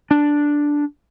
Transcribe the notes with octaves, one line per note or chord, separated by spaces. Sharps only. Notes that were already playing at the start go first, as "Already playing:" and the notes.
D4